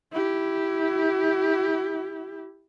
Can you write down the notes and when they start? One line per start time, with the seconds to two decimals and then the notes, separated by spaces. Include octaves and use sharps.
0.12 E4 G4